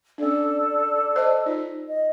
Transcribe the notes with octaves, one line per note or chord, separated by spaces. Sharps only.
C#4 D4 A4 D5
C5 D#5 A5
D#4 F4
D#5